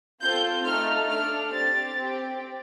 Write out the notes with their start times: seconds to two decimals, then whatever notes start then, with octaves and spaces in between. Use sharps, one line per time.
0.21 C4 F4 A4 G6
0.65 A3 D#4 A4 F6
1.09 D4 A4 F6
1.52 C4 G4 A6
1.96 C4 G4